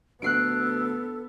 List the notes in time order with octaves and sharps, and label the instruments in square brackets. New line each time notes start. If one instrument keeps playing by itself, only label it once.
[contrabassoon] D2 [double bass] B3 [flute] A4 [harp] F#6 C7 D7